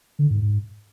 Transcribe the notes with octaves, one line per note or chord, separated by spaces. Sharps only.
D3
G#2
G#2